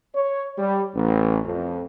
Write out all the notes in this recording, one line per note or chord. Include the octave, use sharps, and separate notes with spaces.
C#5
G3
A1
F2